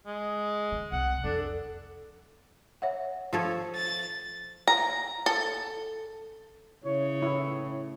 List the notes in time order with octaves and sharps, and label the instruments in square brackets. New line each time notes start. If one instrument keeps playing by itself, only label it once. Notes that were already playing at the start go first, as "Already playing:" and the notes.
[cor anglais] G#3
[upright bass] D3
[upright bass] C2 [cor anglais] F#5
[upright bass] F2 [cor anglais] D4 [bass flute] A4
[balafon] C#5 E5 F#5
[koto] F3 A4 C#5 [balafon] F4
[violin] A6
[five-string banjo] A#5
A4
[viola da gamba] C#3 [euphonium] E4 [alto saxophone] C#5
[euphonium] A2 [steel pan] E4